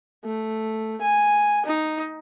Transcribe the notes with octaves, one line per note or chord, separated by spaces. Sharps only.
A3
G#5
D#4